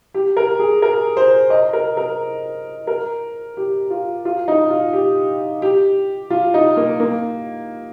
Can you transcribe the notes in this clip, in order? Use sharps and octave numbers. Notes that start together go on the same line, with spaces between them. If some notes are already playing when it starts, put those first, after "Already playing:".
G4
A#4
G#4
A#4
C5
D#5
A#4
A#4
A#4
G4
F4
F4
D#4
F4
G4
G4
F4
D#4
A#3
A#3